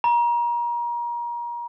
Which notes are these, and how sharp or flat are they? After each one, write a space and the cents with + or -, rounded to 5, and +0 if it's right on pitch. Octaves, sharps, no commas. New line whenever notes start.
A#5 +30